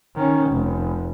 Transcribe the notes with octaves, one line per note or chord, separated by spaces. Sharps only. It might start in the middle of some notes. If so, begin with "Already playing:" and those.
D#3 C#4
F1